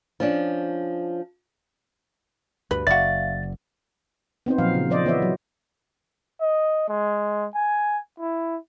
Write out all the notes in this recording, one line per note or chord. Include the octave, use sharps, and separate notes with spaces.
F3 C#4 D4
D2 G2 B4
F#1 F#4 D5 E5 F5 A6
B3 C4 D#4 C5
A#2 F3 F#3 F5
C#3
F3 C5 D5 D#5
E3 B3 C#5 D#5 E5
F#3
D#5
G#3
G#5
E4